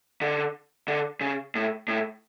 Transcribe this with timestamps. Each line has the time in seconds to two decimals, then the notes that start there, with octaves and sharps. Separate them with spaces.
0.21 D3
0.88 D3
1.21 C#3
1.55 A2
1.88 A2